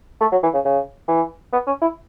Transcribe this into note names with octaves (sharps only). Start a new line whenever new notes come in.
A3
F#3
E3
C#3
C#3
E3
B3
C#4
E4